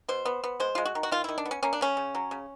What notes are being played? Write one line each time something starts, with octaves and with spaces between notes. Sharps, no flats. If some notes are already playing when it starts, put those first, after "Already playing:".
B2 C5
B3
B3
G#3 C5
G#3 F4
F#4
D#3
F#4
D#3 F4
D#3 E4
D4
B3
C#4
A#3 C#4
D4
C#3 C#4
C#3
F#3
C#3